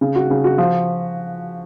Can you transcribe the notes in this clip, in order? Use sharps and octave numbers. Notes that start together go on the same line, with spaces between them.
C#3
F#4
C#3
F#4
F3